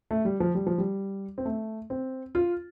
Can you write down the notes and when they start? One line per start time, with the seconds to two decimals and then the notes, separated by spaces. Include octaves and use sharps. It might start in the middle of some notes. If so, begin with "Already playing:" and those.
0.11 A3
0.25 G3
0.40 F3
0.55 G3
0.67 F3
0.78 G3
1.38 C4
1.45 A3
1.90 C4
2.35 F4